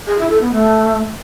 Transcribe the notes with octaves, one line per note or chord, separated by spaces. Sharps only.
G#4
E4
A4
B3
A3